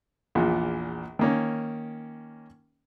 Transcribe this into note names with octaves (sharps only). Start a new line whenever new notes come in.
A#1 E2 A#2
D#3 A#3 C#4